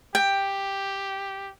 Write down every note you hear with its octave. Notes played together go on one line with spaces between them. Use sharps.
G4 G5